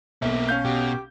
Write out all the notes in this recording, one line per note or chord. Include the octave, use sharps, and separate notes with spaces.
B1 A#3 C4 E5
C#4 F5 G6
B2 G4